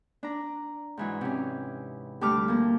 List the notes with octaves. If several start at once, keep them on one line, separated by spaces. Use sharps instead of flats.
D4 A#5
G#2 E3 F#3
C3 C#4
D2 G3 A3 D6 F6
F3 A#3